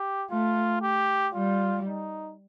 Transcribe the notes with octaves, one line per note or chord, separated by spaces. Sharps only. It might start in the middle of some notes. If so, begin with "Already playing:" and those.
Already playing: G4
A3 F4
G4
G3 F4
D#4